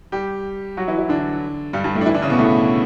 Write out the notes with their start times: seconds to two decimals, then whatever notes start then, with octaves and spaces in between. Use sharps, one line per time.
0.12 G3 G4
0.77 F#3 F#4
0.88 E3 E4
0.98 E3 E4
1.09 D3 D4
1.73 G2 G3
1.84 G2 G3
1.95 A2 A3
2.01 D4
2.06 E3 E4
2.14 D3 D4
2.22 C#3 C#4
2.30 B2 B3
2.38 A2 A3